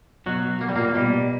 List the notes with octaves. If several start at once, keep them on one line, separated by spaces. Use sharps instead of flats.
B2 F#3 F#4
A#3
G3
A#2 A#3
B2 G3